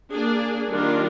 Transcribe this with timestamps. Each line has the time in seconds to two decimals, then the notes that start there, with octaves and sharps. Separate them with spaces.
0.14 A#3 D4 G#4
0.71 D#3 G3 D4 F4 A#4